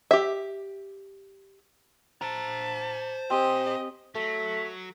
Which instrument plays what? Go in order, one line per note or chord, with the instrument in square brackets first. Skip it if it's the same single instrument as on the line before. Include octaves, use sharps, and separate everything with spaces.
[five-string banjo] G4 E5
[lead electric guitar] C5 A#5 [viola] A5
[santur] C4 G#5 [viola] G4 D#5
[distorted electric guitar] F#3 [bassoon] A3 [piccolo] B6